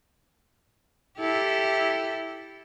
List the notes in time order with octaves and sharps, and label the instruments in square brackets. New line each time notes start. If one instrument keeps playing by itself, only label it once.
[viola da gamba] E4 G4 A4